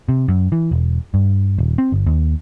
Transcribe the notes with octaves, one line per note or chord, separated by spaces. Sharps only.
C3
F#2
E3
E1
G2
D#1
C4
G1
D#2